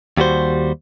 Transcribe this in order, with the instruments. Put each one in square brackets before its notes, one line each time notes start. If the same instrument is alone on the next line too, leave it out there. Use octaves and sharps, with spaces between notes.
[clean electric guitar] D#2 G3 F#4 C5